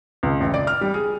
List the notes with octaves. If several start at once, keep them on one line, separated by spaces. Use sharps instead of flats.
C#2
A1
D5
F6
G3
G#4